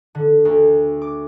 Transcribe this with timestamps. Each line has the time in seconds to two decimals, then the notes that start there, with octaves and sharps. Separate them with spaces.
0.15 D3
0.45 D2
1.02 D6